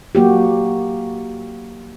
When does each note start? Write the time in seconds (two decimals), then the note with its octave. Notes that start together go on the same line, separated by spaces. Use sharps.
0.15 F#3 A#3 F#4 G4